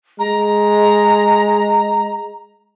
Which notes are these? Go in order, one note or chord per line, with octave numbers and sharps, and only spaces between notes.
G#3 A#5